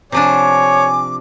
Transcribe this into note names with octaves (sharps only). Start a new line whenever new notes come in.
C3 F3 D4 C#5 G#5 D6